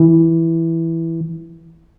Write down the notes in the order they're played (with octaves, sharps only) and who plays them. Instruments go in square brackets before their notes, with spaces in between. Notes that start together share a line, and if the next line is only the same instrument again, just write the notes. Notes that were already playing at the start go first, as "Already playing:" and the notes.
Already playing: [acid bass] E3